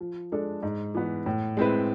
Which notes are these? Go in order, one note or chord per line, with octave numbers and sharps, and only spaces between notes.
F3
G#3 D4 A4
G#2
E3 B3
A2
G#3 C4 E4 B4